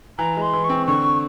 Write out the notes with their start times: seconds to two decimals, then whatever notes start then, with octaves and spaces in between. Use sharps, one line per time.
0.18 E3 A#5
0.36 G#3
0.41 C6
0.53 E3
0.64 C#6
0.69 C4
0.87 D3 C#6